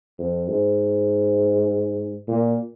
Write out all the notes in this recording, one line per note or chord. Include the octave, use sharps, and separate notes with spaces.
F2
G#2
A#2